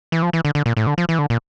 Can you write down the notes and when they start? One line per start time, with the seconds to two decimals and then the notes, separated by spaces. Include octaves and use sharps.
0.12 E3
0.22 F3
0.33 E3
0.45 D3
0.55 D3
0.66 A#2
0.77 A2
0.87 D3
0.98 F3
1.09 E3
1.19 D3
1.30 A#2